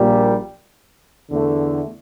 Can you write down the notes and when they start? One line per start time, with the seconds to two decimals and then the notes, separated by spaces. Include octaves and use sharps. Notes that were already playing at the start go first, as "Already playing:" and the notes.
Already playing: A#1 A#2 G3
1.30 E2 D3 A3